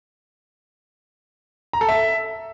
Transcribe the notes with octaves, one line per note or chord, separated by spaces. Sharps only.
A#5
A4
E5